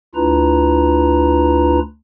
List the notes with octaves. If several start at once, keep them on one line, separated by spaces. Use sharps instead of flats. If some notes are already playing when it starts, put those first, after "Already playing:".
D2 D4 E4 F4 B4 A#5